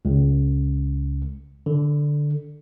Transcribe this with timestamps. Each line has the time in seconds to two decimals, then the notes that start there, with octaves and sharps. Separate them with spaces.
0.05 C#2
1.66 D3